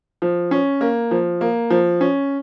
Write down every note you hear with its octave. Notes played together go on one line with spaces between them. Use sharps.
F3
C#4
A#3
F3
A#3
F3
C#4